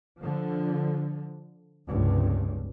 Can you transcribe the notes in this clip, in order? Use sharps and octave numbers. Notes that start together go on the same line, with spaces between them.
D3 F3
F1 C#2 G2